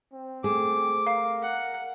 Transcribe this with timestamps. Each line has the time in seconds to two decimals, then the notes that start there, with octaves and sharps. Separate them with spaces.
0.13 C4
0.44 A3 G#4 D6
1.07 A#4 F5
1.42 F#5